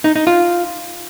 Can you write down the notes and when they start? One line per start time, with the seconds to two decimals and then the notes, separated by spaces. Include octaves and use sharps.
0.04 D#4
0.16 D#4
0.27 F4